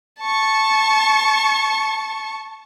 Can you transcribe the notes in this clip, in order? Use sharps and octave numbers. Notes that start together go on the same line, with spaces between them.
A5 C#6